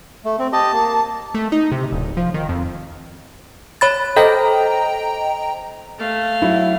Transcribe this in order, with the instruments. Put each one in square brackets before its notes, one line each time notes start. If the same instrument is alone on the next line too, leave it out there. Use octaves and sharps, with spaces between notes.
[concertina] A3
C4
[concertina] G4 D#5 [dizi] A5
[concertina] A#3
[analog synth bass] A3
D#4
C3
D1
F3
D#3
F2
[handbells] C#5 B5 A6
[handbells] A4 C5 [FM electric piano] D#5 G5 A#5
[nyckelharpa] A3 F5
[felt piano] F#3 E4 F#4